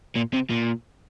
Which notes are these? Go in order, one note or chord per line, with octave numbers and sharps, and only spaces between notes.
A#2
C3
A#2